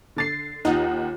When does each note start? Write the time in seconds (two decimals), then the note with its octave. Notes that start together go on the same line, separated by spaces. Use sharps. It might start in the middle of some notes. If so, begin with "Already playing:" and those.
0.16 D3 A6 C7
0.65 D#2 D#4 F4 G4 F#5